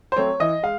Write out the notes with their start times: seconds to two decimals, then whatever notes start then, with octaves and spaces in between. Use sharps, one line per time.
0.12 C5
0.16 F#3 A3 C4 C#5
0.40 E3 D#5
0.63 G#3 F5